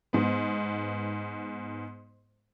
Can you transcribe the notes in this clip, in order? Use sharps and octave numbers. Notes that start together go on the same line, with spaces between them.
G#2 B3